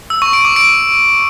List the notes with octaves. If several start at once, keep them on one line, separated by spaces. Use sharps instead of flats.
E6
C#6
D7
D6
D7